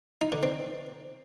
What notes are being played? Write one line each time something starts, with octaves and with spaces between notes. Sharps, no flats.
D#4
D3
C4